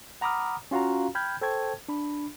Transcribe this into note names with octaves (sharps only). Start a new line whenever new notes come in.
F#5 A#5 B5 D6 D#6 F6
C#4 F4 F#4 F5 A#5
G5 B5 F6 G6 G#6
A4 C5 G5 A5 C#6 G#6
D4 B5